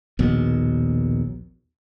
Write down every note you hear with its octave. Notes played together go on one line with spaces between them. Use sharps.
A#1 D#2 B2